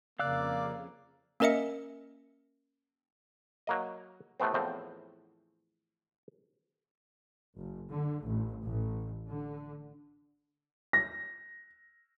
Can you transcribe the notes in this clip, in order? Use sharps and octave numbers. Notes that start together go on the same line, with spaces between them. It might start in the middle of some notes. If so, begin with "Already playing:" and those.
F2 C#3 A#3 D5 F5 E6 F#6
A#3 C#4 A#4 D#5 E5 C#7
F#3 A#3 D#5
A2 C3 A3 B3 C4
E2 A2 F3 C4
F#1
D3
A1
A1
D3
A#6